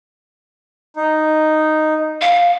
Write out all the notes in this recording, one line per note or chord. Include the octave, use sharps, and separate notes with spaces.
D#4
F5